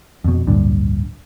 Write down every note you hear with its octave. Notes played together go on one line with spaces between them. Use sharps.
F2 B2
D1 A#1 G2 D3